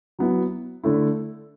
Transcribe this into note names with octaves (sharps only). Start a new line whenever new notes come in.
F#3 B3 E4
D3 A3 E4